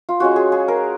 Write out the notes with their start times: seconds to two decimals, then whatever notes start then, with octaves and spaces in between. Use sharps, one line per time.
0.09 F4
0.20 G#3 C#4 F4 F#4
0.36 G#4
0.52 G#4
0.68 A#4